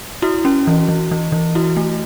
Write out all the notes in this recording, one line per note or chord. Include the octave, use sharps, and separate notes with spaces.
E4 F#4
C#4
E3
E3
E3
E3
E4 F#4
A3